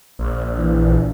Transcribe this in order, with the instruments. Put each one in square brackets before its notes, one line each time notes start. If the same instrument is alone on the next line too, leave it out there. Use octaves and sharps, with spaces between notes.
[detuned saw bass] A#1
[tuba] E3